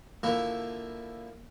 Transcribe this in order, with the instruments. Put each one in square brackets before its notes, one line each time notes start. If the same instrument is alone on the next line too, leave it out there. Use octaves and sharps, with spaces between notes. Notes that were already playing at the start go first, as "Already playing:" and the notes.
[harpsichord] D3 F3 A#3 E4